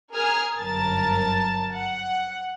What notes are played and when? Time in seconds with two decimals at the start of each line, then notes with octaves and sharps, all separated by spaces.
0.12 G#4 A#4 G#5 D#6 F6 G#6
0.58 G1 F#2 A#4 A5 A6
1.74 F#5